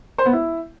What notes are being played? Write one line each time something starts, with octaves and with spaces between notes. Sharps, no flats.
C5
B3
E4